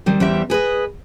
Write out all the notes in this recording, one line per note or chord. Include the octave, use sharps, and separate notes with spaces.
D#3 G3 C4
E2 G3 C4 E5
G#4 B4 C5 D#5